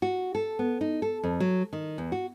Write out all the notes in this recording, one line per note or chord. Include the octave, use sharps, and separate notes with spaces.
F#4
A4
B3
D#4
A4
F2
F#3
D#3
E2
F#4